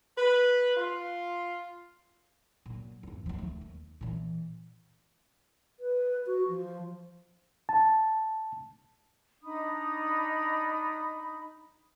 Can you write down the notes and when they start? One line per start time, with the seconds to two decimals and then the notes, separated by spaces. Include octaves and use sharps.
0.16 B4
0.76 F4
2.66 A#2 F#3
3.03 E2 G2
3.26 D#2 F3
3.39 A3
3.61 D#2
4.01 A#2 E3
5.80 B4
6.26 F#4
6.49 F3
7.69 A5
9.42 D4 D#4 B5 D#6